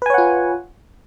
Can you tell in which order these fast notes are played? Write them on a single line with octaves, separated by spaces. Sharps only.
B4 G#5 C#5 F#5 F4